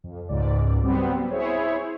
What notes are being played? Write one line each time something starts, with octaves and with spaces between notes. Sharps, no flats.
F2
C#2 G#2 D5
F#3 G3 B3 C4
E4 G#4 C5 C#5